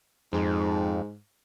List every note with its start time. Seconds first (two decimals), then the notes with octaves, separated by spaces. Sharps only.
0.33 F2 G#2